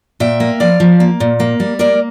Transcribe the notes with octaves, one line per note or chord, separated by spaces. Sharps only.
A#2 E5 G5
A#3
F3 D5 F5
F3
A#3
A#2
A#3
G3
A#3 A#4 D5